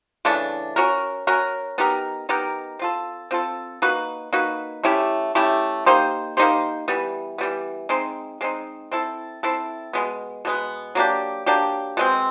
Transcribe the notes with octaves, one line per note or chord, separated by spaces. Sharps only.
C#3 E3 A3 D4
C#4 F#4 A#4
C#4 F#4 A#4
B3 D#4 G4 A#4
B3 D#4 G4 A#4
C4 F4 A4
C4 F4 A4
A#3 D#4 F#4 B4
A#3 D#4 F#4 B4
A3 C#4 E4 G4
A3 C#4 E4 G4
A#3 D#4 G4 C5
A#3 D#4 G4 C5
E3 G3 B3
E3 G3 B3
G#3 C4 D#4
G#3 C4 D#4
C4 E4 A4
C4 E4 A4
B2 G#3 B3
B2 G#3 B3
F#3 A#3 D4 G4
F#3 A#3 D4 G4
B2 G#3 C4